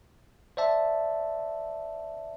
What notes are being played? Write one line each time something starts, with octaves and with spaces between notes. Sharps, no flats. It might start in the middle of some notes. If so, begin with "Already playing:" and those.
C5 D5 E5 A5